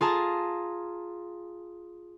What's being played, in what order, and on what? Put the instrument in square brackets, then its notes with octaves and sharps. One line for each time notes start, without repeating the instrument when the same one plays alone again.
[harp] F4 G#4 A5 A#5